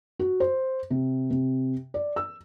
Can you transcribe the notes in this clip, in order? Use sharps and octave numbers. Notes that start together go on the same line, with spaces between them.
F#4
C5
C3
C3
D5
E6